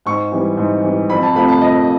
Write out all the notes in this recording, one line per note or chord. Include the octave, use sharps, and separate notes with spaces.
G#2 C#6
E3 G3
G#2
E3 G3
F2 B5
A5
C3 F3 A3 B5
A5
F2 D#5